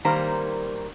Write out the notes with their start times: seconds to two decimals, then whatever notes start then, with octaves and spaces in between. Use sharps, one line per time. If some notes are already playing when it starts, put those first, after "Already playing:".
0.05 D#3 G3 A#3 C5 A#5